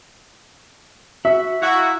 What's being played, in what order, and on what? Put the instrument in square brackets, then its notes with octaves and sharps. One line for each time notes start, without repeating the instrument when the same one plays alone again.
[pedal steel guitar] F#4 [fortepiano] E5
[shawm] E4 [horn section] F#4 [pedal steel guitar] F5 A#5